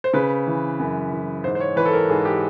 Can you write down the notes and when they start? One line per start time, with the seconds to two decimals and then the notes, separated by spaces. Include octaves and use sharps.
0.04 C5
0.13 C#3 B4
0.47 E3
0.80 F#2
1.12 E3
1.44 G#2 C5
1.55 C5
1.60 C#5
1.76 E3 B4
1.86 A4
1.93 A#4
2.10 G#2 G#4
2.25 G4